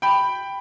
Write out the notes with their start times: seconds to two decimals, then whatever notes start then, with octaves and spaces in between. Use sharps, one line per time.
0.02 G5 B5